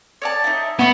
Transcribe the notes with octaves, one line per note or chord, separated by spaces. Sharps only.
C#5 D5 A5
D#4 E4
B3 B4 C#5 D#5